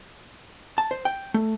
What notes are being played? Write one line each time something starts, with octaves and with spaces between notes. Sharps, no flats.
A5
C5
G5
A3